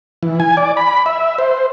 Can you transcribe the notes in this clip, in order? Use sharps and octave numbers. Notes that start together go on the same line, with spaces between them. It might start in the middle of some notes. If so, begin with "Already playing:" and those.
E3
G#5
D5
B5
E5
C5